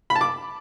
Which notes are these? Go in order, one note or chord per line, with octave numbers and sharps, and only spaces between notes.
B5
A5
D6